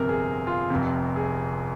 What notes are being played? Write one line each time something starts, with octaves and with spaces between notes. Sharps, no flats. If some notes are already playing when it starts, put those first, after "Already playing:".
Already playing: G1 F2 C3 A#4
G#4
F4
F1 F2 C3
G#4